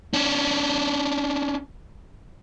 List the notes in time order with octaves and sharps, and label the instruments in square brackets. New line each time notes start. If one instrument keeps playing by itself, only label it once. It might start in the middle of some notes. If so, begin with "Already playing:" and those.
[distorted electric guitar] C#4 D4